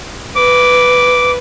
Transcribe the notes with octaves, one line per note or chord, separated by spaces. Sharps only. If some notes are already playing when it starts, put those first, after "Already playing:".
B4 D6